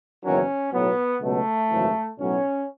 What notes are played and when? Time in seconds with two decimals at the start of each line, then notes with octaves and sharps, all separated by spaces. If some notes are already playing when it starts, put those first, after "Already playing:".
0.24 F#1 E2 D#3 F#3 C#4
0.73 B1 A2 F#3 B3
1.21 C#2 B2 F#3 A3
1.71 G#1 F#2 C#3 E3
2.19 B1 A2 F#3 C#4